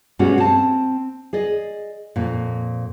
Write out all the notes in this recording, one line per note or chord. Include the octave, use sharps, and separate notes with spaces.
G2 B2 G3 G#3 C#4 F#4
C4 A5
G#4 D5 D#5
F2 A#2